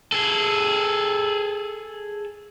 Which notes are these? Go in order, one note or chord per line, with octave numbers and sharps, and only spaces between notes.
G#4 A4